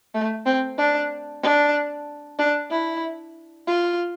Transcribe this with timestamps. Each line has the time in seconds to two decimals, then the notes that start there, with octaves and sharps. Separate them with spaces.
0.14 A3
0.46 C4
0.78 D4
1.43 D4
2.39 D4
2.70 E4
3.67 F4